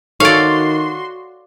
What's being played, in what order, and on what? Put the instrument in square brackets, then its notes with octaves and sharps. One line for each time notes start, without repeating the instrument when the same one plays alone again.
[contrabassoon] D#3 [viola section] F#4 C6 [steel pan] A4 C#5 C#6 [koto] D5 F5